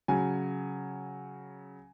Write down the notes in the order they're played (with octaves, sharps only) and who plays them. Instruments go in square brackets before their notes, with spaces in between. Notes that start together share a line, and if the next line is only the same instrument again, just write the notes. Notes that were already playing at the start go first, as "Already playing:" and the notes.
[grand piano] C#3 F#3 G#5